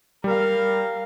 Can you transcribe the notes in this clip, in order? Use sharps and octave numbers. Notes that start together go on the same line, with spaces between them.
G3 A#4 F5